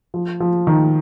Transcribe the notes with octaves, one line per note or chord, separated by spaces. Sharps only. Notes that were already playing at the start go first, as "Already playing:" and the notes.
F3
F3
D#3